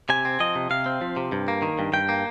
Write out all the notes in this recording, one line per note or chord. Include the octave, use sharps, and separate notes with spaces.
C3 G#5
C4
F3 D#5
C3
C3 F5
C4
F3
C3
G2
A#3
D#3
G2
G2 G5
A#3